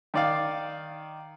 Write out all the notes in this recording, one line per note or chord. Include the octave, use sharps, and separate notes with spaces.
D#3 D5 F5